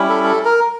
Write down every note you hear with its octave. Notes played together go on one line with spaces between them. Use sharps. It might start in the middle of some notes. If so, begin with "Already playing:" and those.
Already playing: G3 C#4 E4
A4
A4
A#4